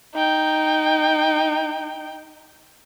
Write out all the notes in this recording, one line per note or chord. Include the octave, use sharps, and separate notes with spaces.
D#4 G5